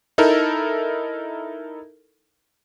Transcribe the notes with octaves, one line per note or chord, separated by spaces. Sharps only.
D#4 E4 A4 A#4